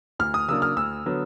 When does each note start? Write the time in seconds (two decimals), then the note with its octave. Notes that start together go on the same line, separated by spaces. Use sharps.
0.19 D2 F6
0.34 D#6
0.48 C#3 F#3 A#3 D4 E6
0.62 F6
0.76 D2 E6
1.06 D3 F#3 B3